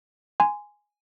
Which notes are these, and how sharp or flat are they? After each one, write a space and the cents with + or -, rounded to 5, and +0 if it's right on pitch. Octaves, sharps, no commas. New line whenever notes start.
G#5 +0 C6 -25